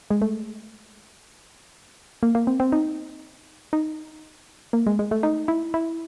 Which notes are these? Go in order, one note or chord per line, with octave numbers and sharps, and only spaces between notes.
G#3
A3
A#3
A#3
C4
C4
D#4
D#4
A#3
G#3
G#3
A3
D#4
E4
E4